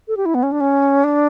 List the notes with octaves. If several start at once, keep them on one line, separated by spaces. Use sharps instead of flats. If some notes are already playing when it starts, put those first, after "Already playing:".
A4
G4
E4
B3
C#4
D4
C#4
D4